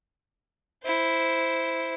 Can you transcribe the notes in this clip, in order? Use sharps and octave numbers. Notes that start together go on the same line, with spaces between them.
E4 C5